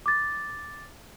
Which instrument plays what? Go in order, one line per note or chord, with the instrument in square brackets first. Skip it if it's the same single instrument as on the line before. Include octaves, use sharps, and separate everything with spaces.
[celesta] D6 A6